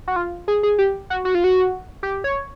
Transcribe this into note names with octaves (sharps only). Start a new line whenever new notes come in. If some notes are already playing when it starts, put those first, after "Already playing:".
F#4
F4
G#4
G#4
G4
F#4
F#4
F4
F#4
G4
C#5